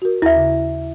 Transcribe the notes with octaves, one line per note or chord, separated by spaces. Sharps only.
F#4 A#4
D#2 E4 E5
C#3